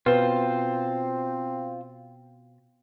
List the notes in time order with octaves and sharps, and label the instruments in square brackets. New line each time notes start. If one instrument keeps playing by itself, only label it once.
[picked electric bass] B2 [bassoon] C4 [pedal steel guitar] F4 C5 [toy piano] B4